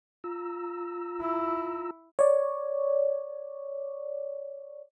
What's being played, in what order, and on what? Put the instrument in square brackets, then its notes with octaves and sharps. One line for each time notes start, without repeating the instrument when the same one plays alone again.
[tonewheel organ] F4 A#5 E6
[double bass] E4
[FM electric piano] C#5 D5